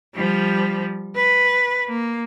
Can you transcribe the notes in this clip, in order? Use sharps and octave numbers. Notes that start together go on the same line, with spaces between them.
F3 G3
B4
A#3